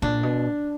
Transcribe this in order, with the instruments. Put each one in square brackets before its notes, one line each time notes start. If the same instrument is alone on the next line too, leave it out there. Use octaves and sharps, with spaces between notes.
[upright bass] A#2 [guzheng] D4
[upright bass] B2